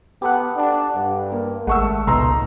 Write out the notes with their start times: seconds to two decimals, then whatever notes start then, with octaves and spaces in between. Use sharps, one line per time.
0.22 B3 G4 A4 F#5
0.56 D4
0.95 G2
1.32 A#3
1.67 G#1 G#3 A3 F#5 C#6 E6
2.07 C#2 A#2 B3 D#4 A#5 C6 E6